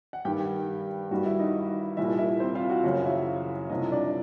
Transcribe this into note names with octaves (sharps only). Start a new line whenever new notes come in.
F#5
G2 D#3 G3 G4 G5
G2 D#3 G3 F#4 F#5
E4 E5
D#4 D#5
C2 A#2 G3 E4 E5
E4 E5
C4 C5
F4 F5
F#4 F#5
F#2 C#3 F3 F#4 F#5
F5
E4 E5
C2 C3 F3 D#4 D#5
D4 D5